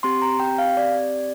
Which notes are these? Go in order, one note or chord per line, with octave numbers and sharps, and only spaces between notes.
C4 G4 C6
A#5
G5
F5
D5